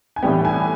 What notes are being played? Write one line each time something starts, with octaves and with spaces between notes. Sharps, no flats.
G#5
A2 E3 G3 B3 G5
G#5